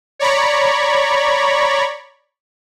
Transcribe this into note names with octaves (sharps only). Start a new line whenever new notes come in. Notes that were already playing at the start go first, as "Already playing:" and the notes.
C#5 D5 A#5 B5 C#6